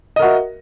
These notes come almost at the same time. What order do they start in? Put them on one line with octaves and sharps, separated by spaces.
D#5 A#4 F#4 E5